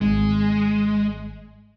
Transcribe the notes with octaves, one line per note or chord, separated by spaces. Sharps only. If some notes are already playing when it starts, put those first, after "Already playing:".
G#1 G#3